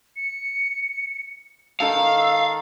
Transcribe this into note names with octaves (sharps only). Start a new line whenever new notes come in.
C#7
D#3 A4 F5 E6
D#3